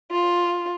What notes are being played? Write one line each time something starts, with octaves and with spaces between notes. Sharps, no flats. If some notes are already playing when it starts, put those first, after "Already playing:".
F4